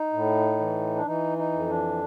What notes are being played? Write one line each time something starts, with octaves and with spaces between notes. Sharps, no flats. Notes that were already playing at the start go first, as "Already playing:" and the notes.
Already playing: D#4
A2
E3
D4
E3 D#4
D#4
F2
D4